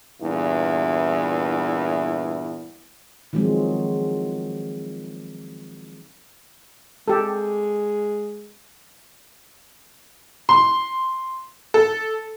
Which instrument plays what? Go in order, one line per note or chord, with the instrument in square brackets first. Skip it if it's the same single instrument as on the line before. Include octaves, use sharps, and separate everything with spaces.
[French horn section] E2 G2 A#2 E4
[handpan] D#3 F3 F#3 G#3 C4
[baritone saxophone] G#3 [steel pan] G4 A4
[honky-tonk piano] C6
A4